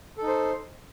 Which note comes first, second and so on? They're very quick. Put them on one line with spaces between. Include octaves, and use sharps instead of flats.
A4 D#4 C5